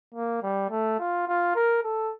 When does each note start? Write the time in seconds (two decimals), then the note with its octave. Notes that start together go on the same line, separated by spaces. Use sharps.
0.15 A#3
0.42 G3
0.70 A3
0.99 F4
1.28 F4
1.55 A#4
1.83 A4